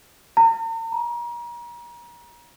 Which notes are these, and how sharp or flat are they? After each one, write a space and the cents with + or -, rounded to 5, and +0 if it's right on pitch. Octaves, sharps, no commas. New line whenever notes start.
A#5 -45
A#5 +35